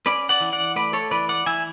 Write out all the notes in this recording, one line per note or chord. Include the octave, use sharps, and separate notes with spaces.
C#4 B4 D5
D5 F#5
E3
D5 F#5
A3 B4 D5
A4 C#5
E3 B4 D5
D5 F#5
E3 E5 G#5